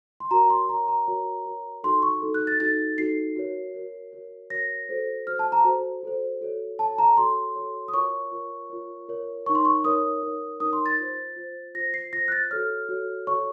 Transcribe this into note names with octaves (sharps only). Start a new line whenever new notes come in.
C6
F#4 A#4 C#5 A#5
C6
F#4 A#4 C#5 A#5
A#5
F#4 A#4 C#5
F#4 A#4 C#5
D#4 F#4 A4 C6
C#6
D#4 F#4 A4
F#6
A6
D#4 F#4 A4 A6
D#4 F#4 A4 C7
F#4 A#4 C#5
F#4 A#4 C#5
F#4 A#4 C#5
F#4 A#4 C#5 A#6
F#4 A4 C5
F#4 A4 C5 F6
A5
A#5
F#4 A4 C5
F#4 A4 C5
F#4 A4 C#5
F#4 A4 C#5 A5
A#5
F#4 A4 C#5 C6
F#4 A4 C#5
D#6
F4 A#4 C#5 C#6
F4 A#4 C#5
F4 A#4 C#5
F4 A#4 C#5
D#4 A#4 C#5 C#6
C6
C#6
D#4 A#4 C#5 D#6
D#4 A#4 C#5
D#4 A#4 C#5 D#6
C6
A6
F4 C5
F4 C5
F4 C5 A#6
C7
F4 C5 A#6
F#6
A6
F#4 A4 C#5 F6
F#4 A4 C#5
F#4 A4 C#5 C#6